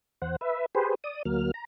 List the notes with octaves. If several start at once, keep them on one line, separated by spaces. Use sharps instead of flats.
E2 C5 F#5
B4 E5
G4 G#4 B4 C5
D5 D#6
D2 F#3 A#3 F6
A#5